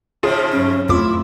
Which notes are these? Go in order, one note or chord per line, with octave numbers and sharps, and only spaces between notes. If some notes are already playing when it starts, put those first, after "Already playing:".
G#2 C#3 F3 F4 G#4
G2 F#3 C#4 D#4
F2 A3 E4 F4 D6